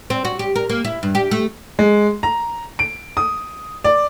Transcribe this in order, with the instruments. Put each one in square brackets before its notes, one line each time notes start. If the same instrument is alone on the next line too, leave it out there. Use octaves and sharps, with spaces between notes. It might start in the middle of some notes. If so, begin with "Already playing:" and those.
[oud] C4
F#4
G4
A#4
A#3
E4
G2
G4
A3
[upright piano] G#3
A#5
D7
D#6
D5